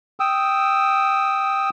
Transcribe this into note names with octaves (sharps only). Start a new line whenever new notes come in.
G5 D#6 E6